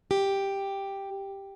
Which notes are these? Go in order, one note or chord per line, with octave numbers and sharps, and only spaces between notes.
G4